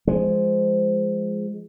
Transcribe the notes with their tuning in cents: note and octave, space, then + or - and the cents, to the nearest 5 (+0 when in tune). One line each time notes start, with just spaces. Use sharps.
F3 -15 G#3 -5